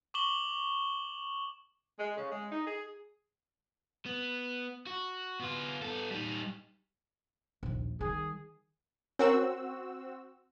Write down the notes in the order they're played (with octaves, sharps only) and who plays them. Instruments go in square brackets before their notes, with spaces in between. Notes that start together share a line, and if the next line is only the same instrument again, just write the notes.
[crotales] C#6 D6 E7 F#7 G7
[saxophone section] G#3
C#3
G#3
D#4
G#4
[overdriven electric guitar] B3
F#4
B3 F4
B3 A4
G3 D#4
[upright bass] A#1 D#2
[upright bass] D#3 G3 [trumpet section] G#4
[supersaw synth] C4 F#4 E6 [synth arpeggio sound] C#4 A#4